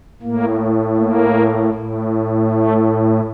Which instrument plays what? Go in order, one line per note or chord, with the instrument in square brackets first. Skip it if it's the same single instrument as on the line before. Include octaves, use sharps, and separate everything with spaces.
[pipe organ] A2 A#3
A#3
A2
A3